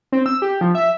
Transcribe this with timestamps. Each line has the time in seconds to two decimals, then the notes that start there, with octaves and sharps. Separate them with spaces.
0.12 C4
0.26 E6
0.42 G4
0.61 F3
0.75 E5